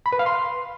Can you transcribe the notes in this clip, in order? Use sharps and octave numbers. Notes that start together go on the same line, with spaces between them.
B5
B4
F5
C6